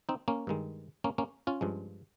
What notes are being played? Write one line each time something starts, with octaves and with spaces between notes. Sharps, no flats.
C4 D#4
A#3 C#4
G2 D#3 G#3
A#3 C#4
A#3 C#4
C#4 F4
G2 F3 G#3